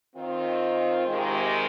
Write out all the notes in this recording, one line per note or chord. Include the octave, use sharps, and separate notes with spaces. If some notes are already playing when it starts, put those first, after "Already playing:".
D#3 C4 F4
C3 D#3 G#3